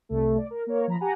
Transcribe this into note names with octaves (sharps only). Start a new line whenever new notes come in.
C2 A3
D5
A#4
A#3 A#4 C#5
F3 A#5 B5
G4 F#5 G#5 A#5